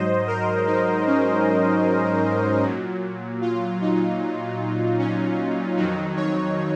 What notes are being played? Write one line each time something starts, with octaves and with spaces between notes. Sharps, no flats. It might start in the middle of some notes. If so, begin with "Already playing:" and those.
Already playing: G#2 F#3 C5 D#5
A#4
D#4
C#4
A#2 F#3
F4
D#4
C#4
F2 D#3 F#3 D#4
C#5